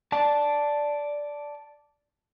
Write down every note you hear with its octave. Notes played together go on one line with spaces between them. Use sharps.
D5 A5